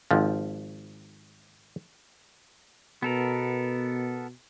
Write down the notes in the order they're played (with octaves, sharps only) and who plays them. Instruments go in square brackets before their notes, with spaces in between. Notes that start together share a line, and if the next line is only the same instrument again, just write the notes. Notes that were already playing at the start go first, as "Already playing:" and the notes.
[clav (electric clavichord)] G#1 F3
[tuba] B2 [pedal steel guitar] B3 A4 A#4